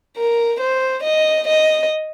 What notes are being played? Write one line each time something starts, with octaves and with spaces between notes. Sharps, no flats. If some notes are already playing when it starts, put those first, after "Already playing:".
A#4
C5
D#5
D#5